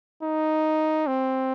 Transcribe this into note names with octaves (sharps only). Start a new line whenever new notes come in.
D#4
C4